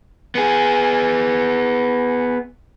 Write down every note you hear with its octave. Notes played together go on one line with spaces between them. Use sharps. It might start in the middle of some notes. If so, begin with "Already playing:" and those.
B3 G#4